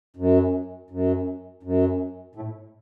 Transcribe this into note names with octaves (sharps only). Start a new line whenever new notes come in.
F#2
F#2
F#2
A2